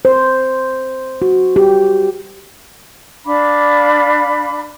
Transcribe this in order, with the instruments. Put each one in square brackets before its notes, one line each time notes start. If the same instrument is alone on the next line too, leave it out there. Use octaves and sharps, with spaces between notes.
[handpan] C5
F#4
G4
[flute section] D4 F5 B5 D6